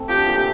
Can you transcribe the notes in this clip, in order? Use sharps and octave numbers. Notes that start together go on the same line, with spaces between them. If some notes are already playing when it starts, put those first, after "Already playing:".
Already playing: A3 C4
F3 G4
D3
A#2
C3